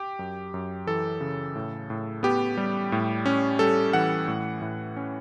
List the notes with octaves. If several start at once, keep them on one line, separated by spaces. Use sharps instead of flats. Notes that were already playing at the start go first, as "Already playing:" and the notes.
Already playing: G4
F#2
F#2
E3 A4
C#3
A2
A2
B3 G4
G3
A2
C#4
G3 A4
E3 F#5
A2
A2
C#4